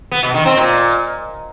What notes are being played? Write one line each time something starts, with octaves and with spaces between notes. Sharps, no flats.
B3
B2
D#3
C4
A#2